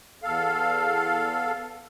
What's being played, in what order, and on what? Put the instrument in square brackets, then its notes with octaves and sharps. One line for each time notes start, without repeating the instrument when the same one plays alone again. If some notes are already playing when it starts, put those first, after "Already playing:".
[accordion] E2 A4 F5